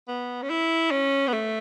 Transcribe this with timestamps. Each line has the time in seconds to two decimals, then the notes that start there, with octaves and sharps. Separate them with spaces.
0.08 B3
0.42 C#4
0.50 E4
0.91 C#4
1.27 B3
1.33 A3